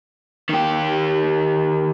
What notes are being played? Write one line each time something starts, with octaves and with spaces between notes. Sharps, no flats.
D#3 G4